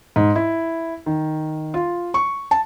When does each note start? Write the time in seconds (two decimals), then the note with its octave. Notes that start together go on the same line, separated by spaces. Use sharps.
0.16 G#2
0.36 E4
1.06 D#3
1.74 F4
2.14 C#6
2.51 A5